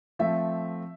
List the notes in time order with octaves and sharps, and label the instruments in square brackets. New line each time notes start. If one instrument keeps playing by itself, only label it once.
[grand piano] F3 A3 C4 [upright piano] E5